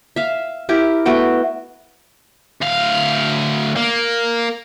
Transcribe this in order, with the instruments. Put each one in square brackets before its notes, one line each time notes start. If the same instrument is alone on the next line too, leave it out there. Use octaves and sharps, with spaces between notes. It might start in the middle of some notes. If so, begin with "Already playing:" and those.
[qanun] E5 F5
E4 G4 A#4
A3 B3 F#4 G5
[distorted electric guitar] D2 F5
A#3